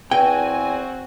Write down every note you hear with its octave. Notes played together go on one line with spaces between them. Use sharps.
E2 C4 F#4 G5 G#5